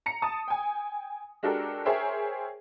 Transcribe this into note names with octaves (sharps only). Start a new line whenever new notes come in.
A#5 C#7
A5 D#6
G5 G#5
G#3 D4 F#4 G4 A4 A#4
G#4 A#4 C5 C#5 E5 G5